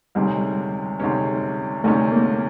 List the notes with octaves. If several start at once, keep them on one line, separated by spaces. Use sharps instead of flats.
D2 C3 D#3 G3 G#3 C#4
D2 C3 D#3 G#3 C#4
D2 C3 D#3 G#3 A3 C#4
A#3